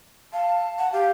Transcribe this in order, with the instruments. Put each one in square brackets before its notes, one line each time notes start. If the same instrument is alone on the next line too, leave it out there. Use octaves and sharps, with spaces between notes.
[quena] F5 [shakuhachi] A5
[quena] F#5
[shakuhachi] G4 [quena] F5